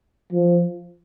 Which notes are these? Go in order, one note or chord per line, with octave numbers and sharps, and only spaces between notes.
F3